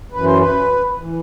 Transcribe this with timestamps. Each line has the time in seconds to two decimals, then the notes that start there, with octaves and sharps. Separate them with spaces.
0.12 F#2 E3 B4
0.25 C5
0.39 B4
0.99 E3